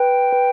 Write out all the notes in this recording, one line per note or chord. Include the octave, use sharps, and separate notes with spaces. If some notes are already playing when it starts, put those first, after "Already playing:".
Already playing: B4 G5
B4